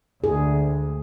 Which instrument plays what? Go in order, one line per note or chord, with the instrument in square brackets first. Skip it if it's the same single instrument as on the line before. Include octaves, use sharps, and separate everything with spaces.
[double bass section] D2 [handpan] G#4